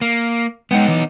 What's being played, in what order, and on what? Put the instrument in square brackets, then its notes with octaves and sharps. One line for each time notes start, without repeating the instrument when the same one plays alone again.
[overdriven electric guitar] A#3
[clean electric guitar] G#3 F#5 G5 [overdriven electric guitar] B3 D#4
[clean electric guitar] E3